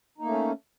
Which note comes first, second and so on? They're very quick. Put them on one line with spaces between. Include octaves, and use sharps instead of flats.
D#4 A#3 A3 C#4